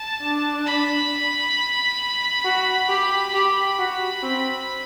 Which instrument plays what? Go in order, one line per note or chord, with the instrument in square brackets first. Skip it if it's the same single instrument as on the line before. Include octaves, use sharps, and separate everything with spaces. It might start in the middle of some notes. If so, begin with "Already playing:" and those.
Already playing: [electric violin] A5
[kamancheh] D4
[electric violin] B5
[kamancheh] F#4
G4
[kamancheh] G4 [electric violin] B5
[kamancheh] F#4
C4